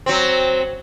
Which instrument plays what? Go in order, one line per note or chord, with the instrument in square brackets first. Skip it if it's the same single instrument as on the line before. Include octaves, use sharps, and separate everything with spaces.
[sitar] F#3 C4